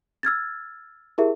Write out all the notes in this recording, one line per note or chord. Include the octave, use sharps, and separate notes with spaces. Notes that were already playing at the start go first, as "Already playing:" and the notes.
E6 F6 G#6 A6
E4 G4 G#4 A#4 E5